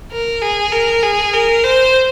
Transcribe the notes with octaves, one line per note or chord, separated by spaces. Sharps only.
A#4
G#4
A#4
G#4
A#4
C5